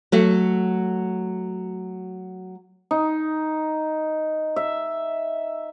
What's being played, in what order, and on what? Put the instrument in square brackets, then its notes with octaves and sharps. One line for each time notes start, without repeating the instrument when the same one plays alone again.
[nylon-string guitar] F#3 A3 F#4
[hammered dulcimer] D#4
E5